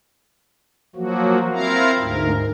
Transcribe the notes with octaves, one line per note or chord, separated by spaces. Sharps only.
F3 F#3 A#3 F#4
C4 E4 F4 A#4 F5 A#5
D2 G#2 A#4